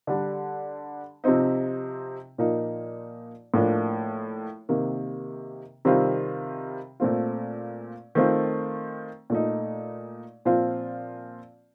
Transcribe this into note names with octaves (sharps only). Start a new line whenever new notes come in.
D3 G3 D4
C3 F3 C4 D#4
A#2 F3 A#3 D#4
A2 F3 A#3 D4
C3 D#3 A#3
C3 D#3 G3 C4 F4
A#2 A3 C4 F4
D#3 A3 C4 F4
A#2 A3 D#4
A#2 F3 C4 F4